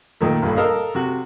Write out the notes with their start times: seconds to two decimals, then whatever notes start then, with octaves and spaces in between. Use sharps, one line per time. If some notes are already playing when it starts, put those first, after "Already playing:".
0.21 A#2 D#3 A3
0.42 A#1 G2 D3
0.56 A4 A#4 D#5 F5
0.95 C3 F#4